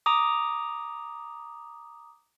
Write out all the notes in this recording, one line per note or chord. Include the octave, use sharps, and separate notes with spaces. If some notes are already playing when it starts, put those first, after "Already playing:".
A#5 D6 D#6